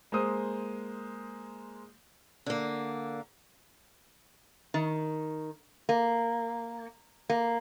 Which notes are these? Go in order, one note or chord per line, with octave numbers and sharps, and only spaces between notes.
G#3 A#3 C5 D#6
D3 A#3
D#3
A#3
A#3